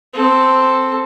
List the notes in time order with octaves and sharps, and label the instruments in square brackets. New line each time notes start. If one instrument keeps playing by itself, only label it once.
[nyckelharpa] C4 A4